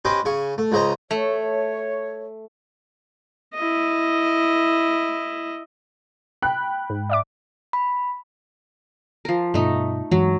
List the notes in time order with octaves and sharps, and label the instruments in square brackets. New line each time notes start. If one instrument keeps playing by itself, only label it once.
[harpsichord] C#4 G4 B4 C5 D#5
C#3 G#5 C#6
A3
C#2 C#3 C5 D#5 A#5
[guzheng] A3 [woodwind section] C#5
[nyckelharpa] E4 D#5
[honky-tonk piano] G5 B5 F#6
[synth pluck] G#2
D5 E5 D6
[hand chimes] B5
[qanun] F3 A#4
[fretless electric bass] G2 B2 [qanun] A3 D#4
[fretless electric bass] G2 E3 G#3 [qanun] F#3